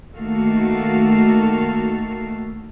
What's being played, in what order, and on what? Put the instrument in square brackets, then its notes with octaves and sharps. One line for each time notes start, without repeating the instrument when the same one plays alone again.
[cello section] D#3 A3 A#3 F#4 A4 F5